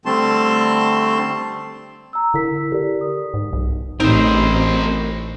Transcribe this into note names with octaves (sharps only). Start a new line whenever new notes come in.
D3 G3 A3 C4 A5 C6
A#5 E6
D3 E4 A#4 B6
G4 A4 A#4 D5
D#6
G#2
B1
A1 C4 D#4 A#4 C5